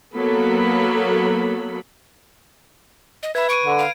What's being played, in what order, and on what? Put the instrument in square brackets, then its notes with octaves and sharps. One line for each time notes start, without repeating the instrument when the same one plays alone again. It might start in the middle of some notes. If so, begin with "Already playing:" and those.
[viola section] F#3 A#3 B3 A4 B5
[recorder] D#5
[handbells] B4 B5 [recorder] E5 [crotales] G#6
[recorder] C#6 [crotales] D7 D#7
[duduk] D3 [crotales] D#7
[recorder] F5